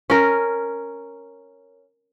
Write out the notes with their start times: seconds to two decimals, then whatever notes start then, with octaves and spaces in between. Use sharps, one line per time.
0.10 C#4 A#4